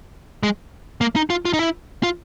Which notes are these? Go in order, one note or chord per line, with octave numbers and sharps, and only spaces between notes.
G#3
A#3
D#4
F4
F4
D#4
E4
F4